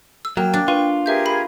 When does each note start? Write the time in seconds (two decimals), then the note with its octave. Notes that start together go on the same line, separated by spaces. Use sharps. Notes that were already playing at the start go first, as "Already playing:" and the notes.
0.25 E6
0.37 F#3 A#3 G5
0.54 D4
0.68 F4 B4 C#6 D#7
1.06 G4 G#4 A#4 B4 E5 G6
1.25 F5 B5